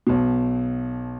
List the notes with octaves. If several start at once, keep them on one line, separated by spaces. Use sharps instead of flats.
B1 B2